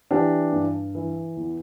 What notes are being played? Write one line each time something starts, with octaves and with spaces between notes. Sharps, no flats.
E3 D4 G4
G2
E3
E2